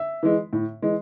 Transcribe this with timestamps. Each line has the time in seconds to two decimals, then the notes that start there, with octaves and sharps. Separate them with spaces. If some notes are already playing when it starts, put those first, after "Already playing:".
Already playing: E5
0.23 E3 G#3
0.53 A2
0.82 E3 G#3